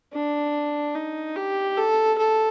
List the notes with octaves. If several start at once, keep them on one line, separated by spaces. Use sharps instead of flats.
D4
D#4
G4
A4
A4